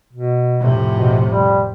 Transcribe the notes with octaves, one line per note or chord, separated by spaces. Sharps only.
B2
F1 A2 C3
B2
G3